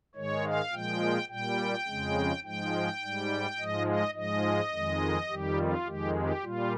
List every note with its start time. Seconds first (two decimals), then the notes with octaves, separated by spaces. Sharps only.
0.15 G#2 D#3 G#3 C#5
0.45 F5
0.72 A#2 F3 G#3 G5
1.29 A#2 G3 G5
1.86 F2 C#3 G#3
2.43 G#2 F3 G#3 G5
3.01 G#2 G3
3.58 G#2 F3 G#3 D#5
3.87 D#5
4.15 G#2 F3 G#3 D#5
4.72 F2 D#3 G#3
5.29 F2 D#3 G3 G4
5.58 F4
5.86 F2 D#3 G#3 G4
6.15 G4
6.43 A#2 G3 F4